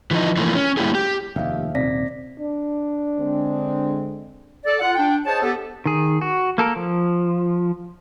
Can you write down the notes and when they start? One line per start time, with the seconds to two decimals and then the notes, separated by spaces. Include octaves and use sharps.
0.11 E3 F3 D#4
0.37 E3 F3 A3 A#3
0.55 C#4
0.77 G3 A3 A#3 E4 G4 G#4
0.95 G4
1.36 F1 D#2 D#4 E5 F5
1.75 D#1 C3 D5 A#6 B6
2.39 D4
3.18 D3 G#3 C4
4.65 A4 D5
4.81 F4 F#5
4.96 D4 G5
5.25 G#4 C5 C#5 D#5 A5
5.43 B3 G4 A4
5.86 D#3 G#4
6.21 F#4
6.58 A#3 A4 A#4
6.76 F3